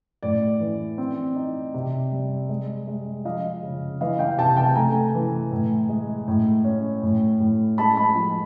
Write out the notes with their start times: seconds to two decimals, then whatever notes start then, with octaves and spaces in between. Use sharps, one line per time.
0.23 A2 D5
0.60 E3
0.98 C4
1.36 D#4
1.74 C3
2.12 G3
2.49 G#3
2.87 G#3
3.25 F3 D#5 F5
3.62 C#3
4.01 E3 D#5 F5
4.19 F5 G5
4.38 C3 G5 A5
4.57 G5 A5
4.75 A3 G#5 A#5
5.14 E3
5.52 A2
5.89 G#3
6.28 A2
6.64 C#4
7.03 A2
7.40 A2
7.78 G#3 A5 B5
7.97 A5 B5
8.15 F3